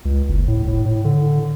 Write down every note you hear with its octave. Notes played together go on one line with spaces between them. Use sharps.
C#2
F#1
A2
A2
A2
D3